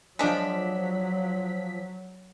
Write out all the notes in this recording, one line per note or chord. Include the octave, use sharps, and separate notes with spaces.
F3 F#3 G#3 D4 B6